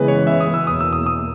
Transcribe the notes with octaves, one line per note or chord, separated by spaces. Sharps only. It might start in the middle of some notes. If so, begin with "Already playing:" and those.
Already playing: F#2 C#3 E3 G#3 B3 B4
C#5
E5
D#6
E6
E2 B2 A#3 D#6
E6
D#6
D#6